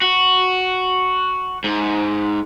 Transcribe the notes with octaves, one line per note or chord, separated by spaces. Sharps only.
F#4
G#2